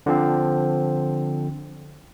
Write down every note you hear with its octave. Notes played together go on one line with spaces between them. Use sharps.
D3 F3 C4